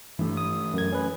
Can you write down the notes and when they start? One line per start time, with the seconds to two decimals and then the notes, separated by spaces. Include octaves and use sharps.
0.19 G2 E3 A3
0.37 D#6
0.74 F#2 G#6
0.92 C#4 B4